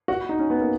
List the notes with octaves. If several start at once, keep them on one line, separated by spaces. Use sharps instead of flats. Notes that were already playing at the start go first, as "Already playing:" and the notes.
F#4
D#4
C#4
B3
A#3